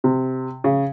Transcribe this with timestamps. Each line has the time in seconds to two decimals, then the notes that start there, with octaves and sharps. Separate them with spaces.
0.04 C3
0.64 C#3